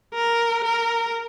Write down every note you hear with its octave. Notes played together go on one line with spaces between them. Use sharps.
A#4
A#4